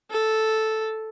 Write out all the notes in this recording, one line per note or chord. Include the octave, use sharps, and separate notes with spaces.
A4